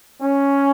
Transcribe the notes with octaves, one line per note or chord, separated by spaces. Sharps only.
C#4